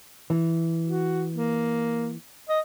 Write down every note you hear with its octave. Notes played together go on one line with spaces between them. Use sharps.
E3
F#4
A#3
D#5